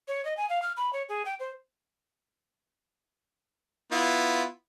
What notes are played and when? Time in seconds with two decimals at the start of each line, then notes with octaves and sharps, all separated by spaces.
0.08 C#5
0.25 D#5
0.37 G#5
0.49 F5
0.62 F6
0.77 B5
0.93 C#5
1.09 G#4
1.25 G5
1.40 C5
3.91 B3 E4 F4